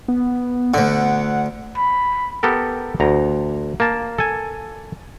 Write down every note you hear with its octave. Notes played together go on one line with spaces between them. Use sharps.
B3
D2 D3 F#5
B5
B3 G4 A4 A#4
D2 A#5
A#3 A5
A4 G#5